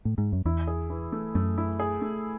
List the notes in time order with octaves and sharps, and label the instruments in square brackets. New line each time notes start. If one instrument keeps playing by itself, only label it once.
[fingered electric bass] A2
G#2
F#2
[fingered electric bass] E2 [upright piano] E4
[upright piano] G#4
E3
A3
[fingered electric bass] F#2 [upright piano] A3
[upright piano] E4
G#4
A3